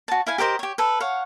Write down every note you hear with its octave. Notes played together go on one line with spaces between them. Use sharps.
F#4 A5
E4 F5 G#5
G4 A#4 C5 D#5
G4 C#5
A4 B4
C#5 F5 F#5